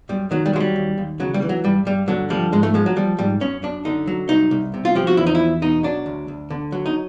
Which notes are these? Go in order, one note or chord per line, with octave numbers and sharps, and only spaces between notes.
F#2 G3
D#3 F#3
G3
F#3 G#3
G3
D#2
D#2
C#3 F#3
G3
E3
F#3
G2 G3
G2 G3
D3 F#3
F3 G3
G#2 G#3
A3
F3 G#3
F#3
F3 G3
G#2 G3
F#2 C#4
F#2 D4
D3 D#4
F#3
C2 D#4
C2
C3
F4
F3 G4
F#4
E2 E4
D#4
E2 E4
B2 D#4
F#3 D4
D2
D2
D3
F#3
D#4